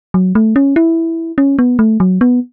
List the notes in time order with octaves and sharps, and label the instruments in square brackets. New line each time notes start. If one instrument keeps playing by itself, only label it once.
[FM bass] F#3
A3
C#4
E4
C#4
B3
A3
F#3
B3